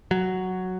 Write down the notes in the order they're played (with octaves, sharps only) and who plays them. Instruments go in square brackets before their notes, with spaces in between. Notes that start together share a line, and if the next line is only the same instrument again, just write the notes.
[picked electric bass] F#3